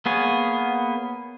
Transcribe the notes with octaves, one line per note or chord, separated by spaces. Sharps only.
A#3 B3 G#4 C#5